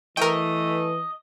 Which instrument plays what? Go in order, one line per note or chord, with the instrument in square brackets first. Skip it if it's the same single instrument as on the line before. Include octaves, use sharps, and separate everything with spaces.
[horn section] E3 [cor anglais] A3 [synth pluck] A#4 G5 [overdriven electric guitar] D#5